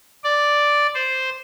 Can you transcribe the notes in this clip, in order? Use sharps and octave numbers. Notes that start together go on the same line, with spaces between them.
D5
C5